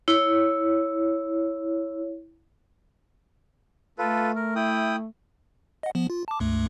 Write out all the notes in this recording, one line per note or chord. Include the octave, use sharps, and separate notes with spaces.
E4 C#5
A3 F4 A4 B4
A#4
E4 G5 D#6
D#5 F#5
F3 B3
F4
A5 D6
C#2 G2 A3